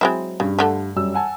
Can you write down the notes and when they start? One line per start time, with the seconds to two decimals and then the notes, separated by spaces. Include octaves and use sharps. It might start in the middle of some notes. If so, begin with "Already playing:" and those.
0.01 F#3 G#3 C4 E4
0.40 G2 C#3
0.59 D3 A3
0.96 F#2 G3 E6
1.14 F#5 G#5 A5